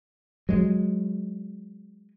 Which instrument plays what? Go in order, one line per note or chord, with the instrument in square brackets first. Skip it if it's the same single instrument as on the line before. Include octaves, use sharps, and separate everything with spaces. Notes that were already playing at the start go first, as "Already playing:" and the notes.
[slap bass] F#3 G#3